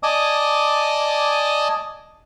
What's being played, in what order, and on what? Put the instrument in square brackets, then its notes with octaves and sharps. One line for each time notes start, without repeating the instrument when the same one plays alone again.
[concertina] D5 D#5 G#5 A5 D6 D#6